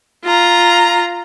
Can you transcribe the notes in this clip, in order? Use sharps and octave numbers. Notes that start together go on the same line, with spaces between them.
F4 A#5